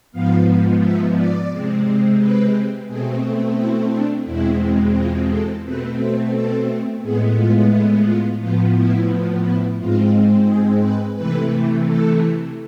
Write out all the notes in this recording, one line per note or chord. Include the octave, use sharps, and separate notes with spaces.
G#2 F3 B3 F5
E5
D5
C3 G#3 C4
B4
B2 A3 C4 G#4
E4
D4
E2 B2 G#3 C4 E4
F4
A4
B2 A3 C4 B4
C5
A4
A2 G#3 B3 G#4
F4
E4
F4
A2 F3 B3 F4
E4
E4
G#2 G#3 C4 F4
G#4
B4
C3 E3 A3 B4
A4